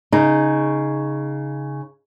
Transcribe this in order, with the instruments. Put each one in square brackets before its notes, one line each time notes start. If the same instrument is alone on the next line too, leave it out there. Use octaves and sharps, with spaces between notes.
[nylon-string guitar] C#3 D#4